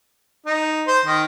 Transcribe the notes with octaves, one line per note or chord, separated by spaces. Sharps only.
D#4
C5
D#3